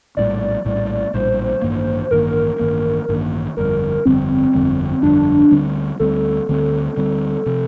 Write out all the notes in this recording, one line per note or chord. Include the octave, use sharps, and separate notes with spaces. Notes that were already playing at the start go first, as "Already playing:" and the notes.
A#1 A2 G3 D5
A#1 A2 G3
A#1 A2 G3 C5
A1 G2 D#3 A#3
A1 G2 D#3 A#3 A#4
A1 G2 D#3 A#3
A1 G2 D#3 A#3
G1 F2 D3 G3 A#4
G1 F2 D3 G3 C4
G1 F2 D3 G3
G1 F2 D3 G3 D4
D2 D3 G3 C4
D2 D3 G3 C4 A4
D2 D3 G3 C4
D2 D3 G3 C4
C3 F3